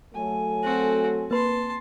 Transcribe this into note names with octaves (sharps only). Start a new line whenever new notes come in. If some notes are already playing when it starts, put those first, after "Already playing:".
F#3 A3 A4 G#5
C4 F#4
A#3 B4 A5 C6